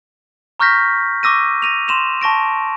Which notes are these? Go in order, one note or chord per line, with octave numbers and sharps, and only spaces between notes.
A#5 C#6 F6 G6 A#6 B6
C#6 D6 E6 A#6 D#7
A#6 D#7 F7
C6 E7 F7
A5 C#6 A#6 D7